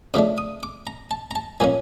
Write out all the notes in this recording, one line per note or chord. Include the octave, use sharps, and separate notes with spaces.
C#3 F3 A3 D4 D6
D#6
D6
A#5
A5
A#5
A5
A#2 F3 A#3 C#4 G#5